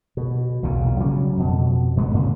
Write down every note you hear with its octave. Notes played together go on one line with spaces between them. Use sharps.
B2
B1 E2 A#2 C#3
C#3 F#3 G3 C#4
F2 B2
D2 G2 A3 B3
A2 C#3